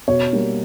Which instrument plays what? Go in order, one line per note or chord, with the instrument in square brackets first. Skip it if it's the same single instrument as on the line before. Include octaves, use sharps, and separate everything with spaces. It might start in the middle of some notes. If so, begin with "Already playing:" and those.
[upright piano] B2 [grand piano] C#5
[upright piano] G3 A#3